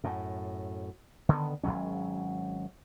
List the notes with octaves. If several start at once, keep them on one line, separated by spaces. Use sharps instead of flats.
F#2 A2
D3 D#3 G3 B3
G#1 F2 F#3 C#4